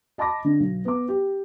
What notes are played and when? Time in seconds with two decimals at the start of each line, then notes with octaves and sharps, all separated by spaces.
0.18 D#5 A5 B5 D6 A#6
0.45 D3
0.60 B1
0.85 B3 D6
1.09 G4